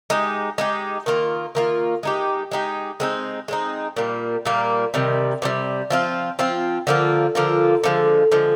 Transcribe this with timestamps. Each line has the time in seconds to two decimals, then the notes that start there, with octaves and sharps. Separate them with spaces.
0.10 G#3 D#4 G4
0.58 G#3 D#4 G4
1.06 D#3 A#3 F4
1.55 D#3 A#3 F4
2.03 G#3 D#4 G4
2.52 G#3 D#4 G4
3.00 G#3 C4 D#4
3.48 G#3 C4 D#4
3.96 A#2 G3 A#3
4.45 A#2 G3 A#3
4.94 C3 D#3 G3
5.42 C3 D#3 G3
5.90 F3 C4 F4
6.39 F3 C4 F4
6.87 D3 F3 A#3 F4
7.35 D3 F3 A#3 F4
7.84 D3 F3 G#3
8.32 D3 F3 G#3